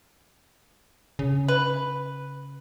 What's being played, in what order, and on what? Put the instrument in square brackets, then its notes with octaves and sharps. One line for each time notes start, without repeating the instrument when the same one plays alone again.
[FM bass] C#3
[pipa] B4